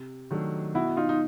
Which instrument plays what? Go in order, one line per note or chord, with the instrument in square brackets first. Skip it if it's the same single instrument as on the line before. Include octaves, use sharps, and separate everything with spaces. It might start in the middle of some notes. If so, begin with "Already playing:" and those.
Already playing: [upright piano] C3
D#3 F#3 A3 D4
[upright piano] B2 [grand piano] E4 F#4
[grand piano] D#4 F4
D#4